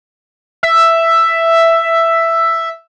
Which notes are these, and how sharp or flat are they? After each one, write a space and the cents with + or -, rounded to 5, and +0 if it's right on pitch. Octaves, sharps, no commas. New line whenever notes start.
E5 +5